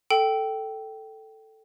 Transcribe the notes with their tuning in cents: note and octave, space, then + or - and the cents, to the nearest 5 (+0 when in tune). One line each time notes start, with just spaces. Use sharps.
A4 +0 G5 -15